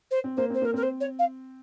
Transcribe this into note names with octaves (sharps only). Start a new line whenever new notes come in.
C5
C4
A#3 C5
C4 C5
A#3 A#4
C4 A#4
C5
C#5
F5